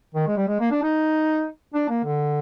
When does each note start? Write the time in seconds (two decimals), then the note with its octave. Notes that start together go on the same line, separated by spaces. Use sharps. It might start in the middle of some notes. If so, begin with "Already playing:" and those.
0.15 D#3
0.27 G#3
0.37 G3
0.48 G#3
0.60 A#3
0.71 D4
0.83 D#4
1.74 D4
1.89 A#3
2.04 D3